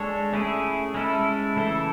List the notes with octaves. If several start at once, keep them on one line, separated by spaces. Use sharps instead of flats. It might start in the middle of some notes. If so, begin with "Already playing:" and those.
Already playing: G#3 D4 A4 C#5
A3 C#4 E4 G#4
G#3 C#4 E4 A4
C#3 E3 A3 E4 A4